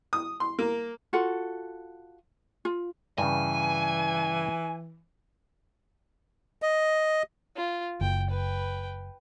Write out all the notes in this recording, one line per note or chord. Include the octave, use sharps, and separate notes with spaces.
D#6
C6
A#3
F4 F#4 A4 F#5
F4
G2 C#3 E3 G#5
D#5
F4
F#1 G5
B4 G5